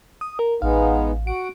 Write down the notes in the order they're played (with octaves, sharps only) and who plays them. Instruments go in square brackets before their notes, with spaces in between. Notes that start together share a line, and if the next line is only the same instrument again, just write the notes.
[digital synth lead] D#6
A#4
[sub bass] A1 [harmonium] G#3 B3 D#4 [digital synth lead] F5
[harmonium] F#4 F#5 [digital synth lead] D7